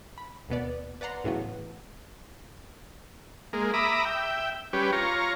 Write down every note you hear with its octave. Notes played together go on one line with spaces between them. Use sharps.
B5
D#2 B2 B3 D5
B4 D5 F#5 A#5 C6
A2 C#3 E3 F#3 A3 B3
G#3 A#3
E5 A#5 B5 D6 D#6
E5 G5
G3 C#4 G4 B4
F4 C#5 A#5